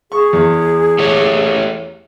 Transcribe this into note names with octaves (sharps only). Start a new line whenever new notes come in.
G#4 C#6
E2
A3 G4 C#5